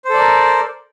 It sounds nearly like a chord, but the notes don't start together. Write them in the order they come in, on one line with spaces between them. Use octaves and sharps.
C5 A4 D5 A#4